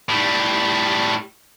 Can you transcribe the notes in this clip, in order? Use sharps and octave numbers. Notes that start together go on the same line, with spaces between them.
A2 G3